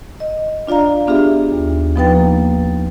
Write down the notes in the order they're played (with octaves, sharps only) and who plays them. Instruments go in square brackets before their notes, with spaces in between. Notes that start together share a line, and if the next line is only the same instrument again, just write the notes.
[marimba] D#5
D4 F4 D5 F5 A#5
B3 D4 F4 G4 G#4 E5
D#2
F3 B3 D#4 B4 G5 A6
A#3